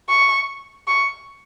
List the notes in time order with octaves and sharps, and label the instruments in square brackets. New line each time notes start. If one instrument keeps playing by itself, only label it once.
[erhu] C#6
C#6